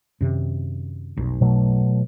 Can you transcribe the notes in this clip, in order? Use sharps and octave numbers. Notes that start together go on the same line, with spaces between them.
F#2 C3 D#3
F1 B1
B2 F#3 A3